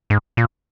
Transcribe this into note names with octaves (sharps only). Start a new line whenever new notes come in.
G#2
A#2